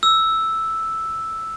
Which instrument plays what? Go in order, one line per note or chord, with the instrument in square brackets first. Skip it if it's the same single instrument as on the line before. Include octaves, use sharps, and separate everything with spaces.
[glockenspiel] E6